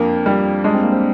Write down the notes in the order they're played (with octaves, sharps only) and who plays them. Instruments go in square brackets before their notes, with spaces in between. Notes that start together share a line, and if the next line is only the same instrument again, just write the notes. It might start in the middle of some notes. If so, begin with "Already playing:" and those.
Already playing: [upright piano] F2 A#3 [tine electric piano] C4 D4
[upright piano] G3
[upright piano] G#3 [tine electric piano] D4
[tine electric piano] C4
A#3
C4